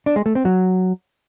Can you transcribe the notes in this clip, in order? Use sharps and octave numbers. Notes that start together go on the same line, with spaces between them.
D4
G#3
A3
C4
F#3